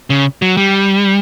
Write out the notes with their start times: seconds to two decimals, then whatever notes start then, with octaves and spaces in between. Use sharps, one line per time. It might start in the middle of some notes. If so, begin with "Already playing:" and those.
0.10 C#3
0.42 F#3
0.57 G3